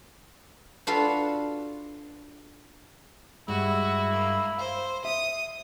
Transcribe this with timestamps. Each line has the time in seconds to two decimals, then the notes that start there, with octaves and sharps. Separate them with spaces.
0.87 D4 F4 F#4 A4 B4 F5
3.48 G2 G#3 E4 F#4
4.12 A#3
4.58 C5 F5
5.05 E5 D#6